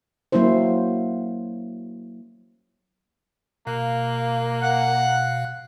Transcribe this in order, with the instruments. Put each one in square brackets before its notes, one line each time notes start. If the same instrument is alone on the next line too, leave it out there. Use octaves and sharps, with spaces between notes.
[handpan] F#3 A#3 C#4 E4 C5
[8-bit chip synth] B2 F5 F#6 [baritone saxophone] A#3
[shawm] F#5